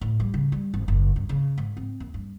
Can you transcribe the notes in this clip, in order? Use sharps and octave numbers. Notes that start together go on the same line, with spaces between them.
A2
G3
C#3
G3
G#1
F#1
G2
C#3
G#2
C4
D#2
G2